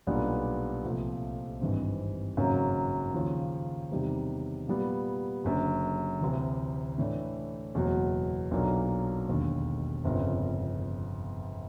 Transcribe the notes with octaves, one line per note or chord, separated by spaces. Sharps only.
B1 A#2 G3 B3 D4
C2 A#2 F3 A3
G#1 G2 E3 G3 C4
G#1 F#2 C#3 F#3 A#3
D#2 C#3 F3
E2 C3 D#3 G3
A#2 G3 B3
F#1 F#2 D3
D2 C3 E3
A2 E3 A3 D4
F#1 E2 B2 F#3
B1 A#2 F#3 A#3 D4
E1 D#2 D3
G1 F2 C#3